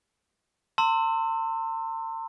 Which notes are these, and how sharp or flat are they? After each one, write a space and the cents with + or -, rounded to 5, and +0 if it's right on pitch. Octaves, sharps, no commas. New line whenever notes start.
A5 +45 C6 +0 E6 +0